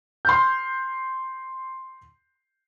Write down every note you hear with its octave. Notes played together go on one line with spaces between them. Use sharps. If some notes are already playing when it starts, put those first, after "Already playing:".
C6 F6 G6